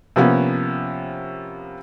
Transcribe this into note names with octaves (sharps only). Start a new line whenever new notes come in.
C3 F3 A#3 B3 C#4